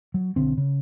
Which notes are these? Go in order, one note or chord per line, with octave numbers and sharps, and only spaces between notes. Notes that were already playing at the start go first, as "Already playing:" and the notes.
F#3
B1 D3 C4
C#3